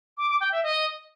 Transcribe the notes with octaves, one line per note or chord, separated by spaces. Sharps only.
D6
D6
G5
E5
D#5